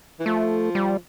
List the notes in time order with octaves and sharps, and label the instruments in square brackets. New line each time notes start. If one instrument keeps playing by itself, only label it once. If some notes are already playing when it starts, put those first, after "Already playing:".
[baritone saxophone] E3
[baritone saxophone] F3 [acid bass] A3
[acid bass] G3